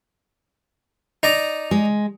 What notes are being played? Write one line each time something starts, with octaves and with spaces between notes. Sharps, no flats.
D#4 D5 A#5
G#3